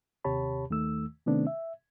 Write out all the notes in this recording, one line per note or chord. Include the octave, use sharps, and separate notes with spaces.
D#2 C3 G4 C#5 A5 B5
D#2 D#3 A3 E6
C3 D#3 A3 B3 C4 D4
E5